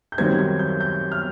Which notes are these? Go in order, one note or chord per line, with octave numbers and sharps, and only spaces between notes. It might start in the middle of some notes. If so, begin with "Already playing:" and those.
G6
F#2 D#3 G3 C4 G#6
G#6
G6
G6
F6